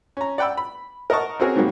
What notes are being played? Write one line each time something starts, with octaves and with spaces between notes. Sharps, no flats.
C#4 A#5
D5 F#5 G5 B5 E6
B5
A#4 D#5 F#5 A5 C#6
C4 C#4 F#4 G#4 A#4
G#2 D#3 F#3 G3 A#3